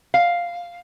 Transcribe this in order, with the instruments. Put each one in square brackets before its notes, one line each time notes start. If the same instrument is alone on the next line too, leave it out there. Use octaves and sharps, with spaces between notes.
[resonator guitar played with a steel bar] F5